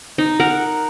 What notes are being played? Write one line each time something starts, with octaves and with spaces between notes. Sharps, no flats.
D#4
A#4 F#5